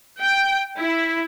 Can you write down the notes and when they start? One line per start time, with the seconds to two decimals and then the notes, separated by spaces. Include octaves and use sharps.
0.22 G5
0.79 E4